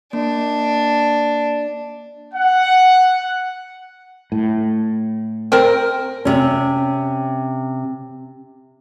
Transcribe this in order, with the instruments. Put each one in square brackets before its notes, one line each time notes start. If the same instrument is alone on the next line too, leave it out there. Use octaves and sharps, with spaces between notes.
[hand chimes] A#3 [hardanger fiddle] D4
[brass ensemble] F#5
[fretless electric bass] A2
[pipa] C4 A#4
[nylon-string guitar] C3 C#4